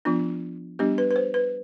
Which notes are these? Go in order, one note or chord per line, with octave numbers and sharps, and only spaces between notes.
F3 B3 D4 F4
G3 B3 D4 G4
B4
B4
C5
B4